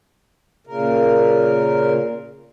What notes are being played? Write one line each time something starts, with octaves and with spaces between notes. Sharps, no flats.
A#2 C#3 A#4